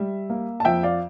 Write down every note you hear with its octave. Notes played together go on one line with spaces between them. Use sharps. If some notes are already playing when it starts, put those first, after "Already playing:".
Already playing: G3 E5
A#3
A5
F2 E5 G5
D5 F5